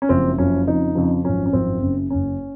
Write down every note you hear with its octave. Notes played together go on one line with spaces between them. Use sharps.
C#4
F#1 F#2 C#3 F3 C4
F#1 F#2 C#3 F3 C#4
F2 C#3 F3 D#4
F2 C#3 F3
G#1 F#2 F3 C#4
C#4
G#1 F#2 F3 C4
F#1 F#2 C#3
F#1 F#2 C#3 C#4